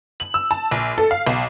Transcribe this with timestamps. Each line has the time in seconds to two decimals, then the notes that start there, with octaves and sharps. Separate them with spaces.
0.20 F#7
0.34 E6
0.51 A5
0.71 A#1
0.98 A4
1.11 F5
1.27 B1